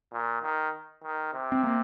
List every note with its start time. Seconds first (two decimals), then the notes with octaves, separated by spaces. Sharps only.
0.12 A#2
0.42 D#3
1.03 D#3
1.33 C3
1.52 C4
1.63 A#3